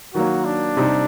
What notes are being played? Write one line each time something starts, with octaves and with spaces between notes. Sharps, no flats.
D#3 F#3 A#3 F#4
D4
C3 G3 C4 D#4